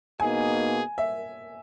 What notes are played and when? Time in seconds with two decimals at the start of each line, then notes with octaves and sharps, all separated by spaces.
0.20 B2 A#3 D#4 G#4 G#5
0.98 E5